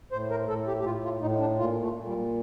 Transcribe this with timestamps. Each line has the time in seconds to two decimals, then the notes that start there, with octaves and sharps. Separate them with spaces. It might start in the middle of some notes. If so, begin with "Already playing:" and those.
0.12 A2 C5
0.31 A#4
0.49 A2 A4
0.67 G4
0.79 G4
0.85 A2 F4
1.04 F4
1.21 A2 D#4
1.40 D4
1.58 A#2 F4
1.81 A3
1.94 A#2
2.06 G3